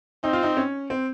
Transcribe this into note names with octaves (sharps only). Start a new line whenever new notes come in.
C4 D#4
F4
D#4
C#4
C4